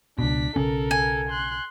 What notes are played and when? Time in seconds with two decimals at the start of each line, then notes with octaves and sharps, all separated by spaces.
0.19 C#2 B2 D4 B6
0.56 B1 C#3 C#4 A4 A#4
0.91 G#5
1.29 C6 F#6